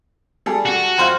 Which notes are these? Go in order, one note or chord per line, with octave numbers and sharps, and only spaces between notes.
G3 G#4 A4
F#4
F2 C5 F5